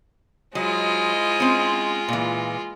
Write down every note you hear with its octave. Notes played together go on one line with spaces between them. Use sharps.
F#3 G#3 E4 F4 C5 D#5
C4 C#4
A#2 E3